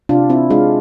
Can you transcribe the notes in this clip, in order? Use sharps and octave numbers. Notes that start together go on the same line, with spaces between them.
C3 D4 F4
C4 E4
G#3 D4 F4